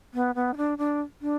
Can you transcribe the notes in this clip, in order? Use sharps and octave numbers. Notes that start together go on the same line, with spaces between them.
B3
B3
D#4
D4
D4
D4